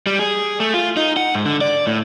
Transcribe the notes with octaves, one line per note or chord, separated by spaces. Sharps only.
G3
G#4
A3
F4
D#4
F#5
G#2
D3
D5
A2